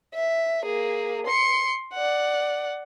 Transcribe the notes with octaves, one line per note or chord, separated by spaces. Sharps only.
E5
A#3 G#4
C6 C#7
D5 F#5